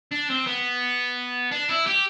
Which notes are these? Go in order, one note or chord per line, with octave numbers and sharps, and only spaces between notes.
D4
C4
B3
D4
E4
G4